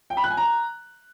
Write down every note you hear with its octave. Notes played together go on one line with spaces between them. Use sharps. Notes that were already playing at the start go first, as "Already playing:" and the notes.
G5
B5
F#6
G#5
A#5